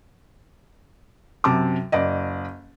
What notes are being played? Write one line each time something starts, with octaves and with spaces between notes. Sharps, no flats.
F#2 C3 A5 D6
F#1 D5 D#5